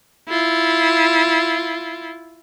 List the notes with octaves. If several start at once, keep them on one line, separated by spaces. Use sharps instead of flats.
E4 F4